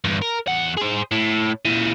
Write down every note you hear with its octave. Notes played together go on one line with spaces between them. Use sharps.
E2 G2
A#4
E2 F#5
G#4 C5
A2
A#2 E3